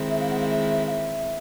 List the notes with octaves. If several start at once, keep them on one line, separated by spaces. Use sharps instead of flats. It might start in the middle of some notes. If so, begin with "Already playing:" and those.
Already playing: D#3 G#3 C4 E4
E5
F5
F#5
F5
E5
F5
E5